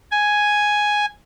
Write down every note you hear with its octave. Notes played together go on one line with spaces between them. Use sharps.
G#5